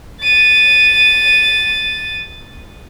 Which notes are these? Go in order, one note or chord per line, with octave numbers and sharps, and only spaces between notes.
A6 D#7